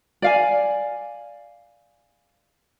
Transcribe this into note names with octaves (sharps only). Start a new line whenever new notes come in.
D5 F5 G#5